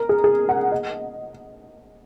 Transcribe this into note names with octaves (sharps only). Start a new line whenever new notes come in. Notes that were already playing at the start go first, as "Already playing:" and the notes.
Already playing: A#4
G#4
G#4
F#5
D#5